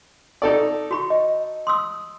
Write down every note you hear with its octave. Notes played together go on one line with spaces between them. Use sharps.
D#4 A4 D5
F#4 B5 C#6
D#5
C6 D#6 E6